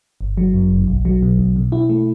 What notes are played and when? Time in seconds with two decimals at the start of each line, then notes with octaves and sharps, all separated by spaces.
0.21 G1
0.37 F#3
0.54 F#2
0.72 G1
0.88 B1
1.05 F#3
1.22 B2
1.38 B1
1.56 B2
1.72 E4
1.90 A3